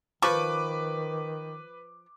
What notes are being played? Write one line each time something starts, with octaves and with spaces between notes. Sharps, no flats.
D#3 F3 B4 C#6 D6